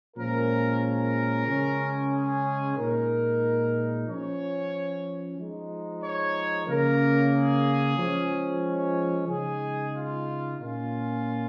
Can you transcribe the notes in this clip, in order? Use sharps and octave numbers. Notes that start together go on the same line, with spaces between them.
A#2 F3 G#3 C#4 A#4
A#4
C#3 G#3 C#4
G#4
A#2 G#3 D#4 A#4
F3 C#4 C#5
F3 G#3 D#4
C#5
C#3 A#3 C#4 A#4
G#4
F3 G#3 C#4
C#5
C#3 G#3 D#4 G#4
F4
A#2 A#3 C#4 F4